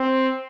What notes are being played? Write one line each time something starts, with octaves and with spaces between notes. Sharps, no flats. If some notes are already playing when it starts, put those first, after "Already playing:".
Already playing: C4